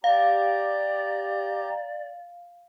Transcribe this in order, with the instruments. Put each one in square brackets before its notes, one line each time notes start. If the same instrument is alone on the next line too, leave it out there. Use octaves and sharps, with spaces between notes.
[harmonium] G4 A#5 [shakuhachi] D5 [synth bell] F5